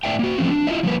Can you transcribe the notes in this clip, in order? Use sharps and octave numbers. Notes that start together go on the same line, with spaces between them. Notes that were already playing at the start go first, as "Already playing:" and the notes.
A2 D4 D5 E5 G5
A#3 F#4
E3 F3 A3 C4 C#4
D4
E4 F4 B4 C#5 D#5 E5
F3 G3 A#3 B4